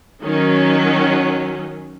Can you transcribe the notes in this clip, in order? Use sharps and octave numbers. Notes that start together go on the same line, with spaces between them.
D#3 F#3 C#4